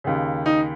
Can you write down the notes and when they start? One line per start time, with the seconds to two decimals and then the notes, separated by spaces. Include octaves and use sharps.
0.04 D#2 C#3
0.46 D#4